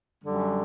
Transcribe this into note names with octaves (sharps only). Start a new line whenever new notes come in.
F#2 D3 G3